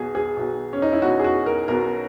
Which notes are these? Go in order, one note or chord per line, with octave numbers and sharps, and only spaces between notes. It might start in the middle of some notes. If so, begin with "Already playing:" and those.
Already playing: B1 B2 G#4
G#4
B1 B2
C#4
D#4
E4
B1 B2 F#4
G#4
F#4
A#4
B1 B2 A#4